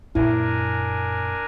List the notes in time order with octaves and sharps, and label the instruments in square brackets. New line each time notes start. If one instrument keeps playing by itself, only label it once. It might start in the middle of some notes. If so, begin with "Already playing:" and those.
[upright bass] F#2 A#2 [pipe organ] D4 A#4 G#5 [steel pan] E4